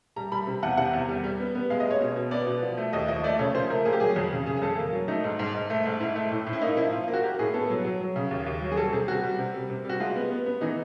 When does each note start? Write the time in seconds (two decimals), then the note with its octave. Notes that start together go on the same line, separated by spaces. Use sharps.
0.16 G3 A#5
0.32 G3 B5
0.47 C3
0.63 E2 F#5
0.77 C3 F#5
0.93 E2
1.08 G3
1.24 G3
1.40 B3
1.55 B3
1.70 G#3 F5
1.80 D#5
1.85 G#3
1.91 C#5
2.00 B2
2.16 B2
2.31 B3 D5
2.47 B2
2.62 F3
2.77 A3
2.93 D#2 D#5
3.08 F3 D#5
3.24 A3 D5
3.39 C#3 C#5
3.54 F3 C5
3.70 A3 A#4
3.85 A#3 G#4
3.93 G4
4.00 F#3 G#4
4.16 F2
4.32 C#3
4.46 C#3 G#4
4.57 G#4
4.62 F2 A4
4.78 A#3
4.92 F#3
5.08 A3 D#4
5.24 G#2
5.39 G#2
5.54 G#2
5.70 A3
5.85 G#2
6.00 G#2 E4
6.16 A3
6.31 A2
6.47 A2
6.53 E4
6.62 A#3 D#4
6.77 F3 E4
6.93 F3 F4
7.03 F4
7.08 A#3
7.13 F#4
7.23 A#3 G4
7.39 A2 G#4
7.54 B3 A4
7.70 F#3
7.84 F#3
8.01 F#3
8.16 C#3
8.31 D#2
8.46 D#2
8.62 F#3
8.72 G#4
8.77 G3 A4
8.93 C3 G#4
9.08 G3 F#4
9.24 G3
9.39 C3
9.54 G3
9.70 C3
9.85 G3 F#4
10.00 G#3 F4
10.16 B3
10.31 B3
10.46 B3
10.61 E3 D#4